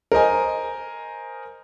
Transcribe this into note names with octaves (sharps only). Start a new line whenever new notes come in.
A#4 C5 D#5 G#5